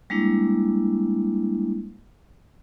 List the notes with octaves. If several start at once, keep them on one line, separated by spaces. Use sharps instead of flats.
G3 G#3 A#3 D4 E4